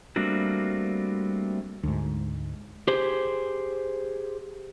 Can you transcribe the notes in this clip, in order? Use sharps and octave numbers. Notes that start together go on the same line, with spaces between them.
G3 A3 A#3 C4 D4 F#4
D2 G#2
G4 G#4 C5